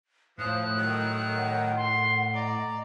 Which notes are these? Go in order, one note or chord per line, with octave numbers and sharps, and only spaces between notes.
A2 F3 D#6 F#6
D#3 F#3
F#5
C6
D5 D#5 A#5